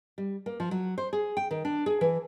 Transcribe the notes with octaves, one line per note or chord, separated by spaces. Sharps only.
G3
A#3
F3
F#3
C5
G#4
G5
D#3
D4
G#4
E3